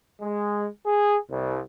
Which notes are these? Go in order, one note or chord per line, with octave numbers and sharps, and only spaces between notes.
G#3
G#4
C2